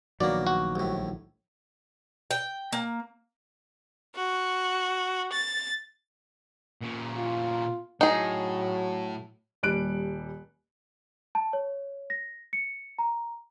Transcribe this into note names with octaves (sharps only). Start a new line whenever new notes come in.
A#1 B2 D#3 F#3 A#3 D5
F#4
C2 A2
G5
A#3
F#4
A6
A#2 C#4
F4
A2 F#3 D#4 G#4
D#1 G3 F#6 D7
A5
C#5
A#6
C#7
A#5